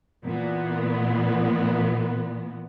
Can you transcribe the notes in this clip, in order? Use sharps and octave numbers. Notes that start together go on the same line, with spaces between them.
A#2 E3 B3